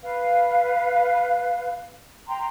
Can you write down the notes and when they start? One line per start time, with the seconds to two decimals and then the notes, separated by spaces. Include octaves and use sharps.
0.03 B4 F5
2.29 G5 A#5 C6